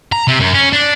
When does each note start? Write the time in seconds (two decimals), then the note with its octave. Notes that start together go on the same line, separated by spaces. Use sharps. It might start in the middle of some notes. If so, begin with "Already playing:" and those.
0.12 A#5
0.28 C3
0.40 F#2
0.54 C#4
0.73 D4